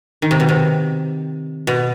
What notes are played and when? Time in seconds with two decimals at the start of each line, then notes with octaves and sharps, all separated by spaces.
0.22 D#3
0.31 C3
0.40 B2
0.49 C3
1.67 B2